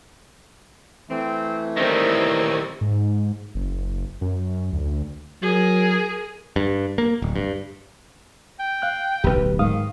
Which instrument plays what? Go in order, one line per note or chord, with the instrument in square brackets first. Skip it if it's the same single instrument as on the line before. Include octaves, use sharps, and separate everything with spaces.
[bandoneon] E3 A3 [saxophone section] C4
[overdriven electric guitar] D#3 G3 [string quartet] C4 A#4 [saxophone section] E4 C#5 D#5
[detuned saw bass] G#2
F#1
F#1
F#2
D2
[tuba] F#3 [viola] G#4 A#4
[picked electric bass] G2
A#3
D1
G2
[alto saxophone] G5
[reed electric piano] F5 F#6
[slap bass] D1 B1 [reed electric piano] G4 B4
[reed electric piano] G#2 F5 D#6 [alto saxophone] D#3